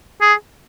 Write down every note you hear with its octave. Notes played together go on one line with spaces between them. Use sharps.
G#4